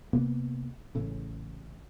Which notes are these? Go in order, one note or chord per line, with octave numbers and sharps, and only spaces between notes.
C3 A#3 B3
A1 A2 C#3